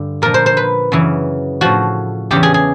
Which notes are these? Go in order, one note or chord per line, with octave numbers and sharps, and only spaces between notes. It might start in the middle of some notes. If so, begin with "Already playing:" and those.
Already playing: G2 D3
A#2 F3 A#4
C5
C5
B4
F#2 C#3 E3
A2 F3 F#4
E2 C#3 E3 G4
G#4
G#4